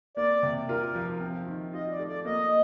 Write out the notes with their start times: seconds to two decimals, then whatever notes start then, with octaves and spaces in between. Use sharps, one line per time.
0.17 A#3 D5
0.43 C3
0.69 F4 A#4
0.95 F3
1.20 C4
1.47 D#3
1.73 F4 D#5
1.91 D5
1.99 A3
2.08 D5
2.25 A#3 D#5